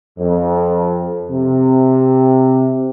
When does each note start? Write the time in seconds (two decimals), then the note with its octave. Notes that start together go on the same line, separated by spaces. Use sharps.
0.19 F2
1.31 C3